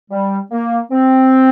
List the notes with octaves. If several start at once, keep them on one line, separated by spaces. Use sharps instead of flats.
G3
A#3
C4